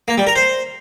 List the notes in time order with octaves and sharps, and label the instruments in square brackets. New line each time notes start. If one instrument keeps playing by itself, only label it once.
[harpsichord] A#3
G3
A#4
C5